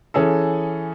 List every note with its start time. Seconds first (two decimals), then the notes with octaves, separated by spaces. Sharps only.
0.14 E3 C#4 G#4 A4